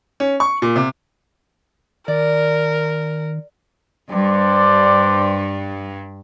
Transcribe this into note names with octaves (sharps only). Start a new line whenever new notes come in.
C#4
C#6
A#2
C3
D#3 A#4 D5
G2 D4 C5 D5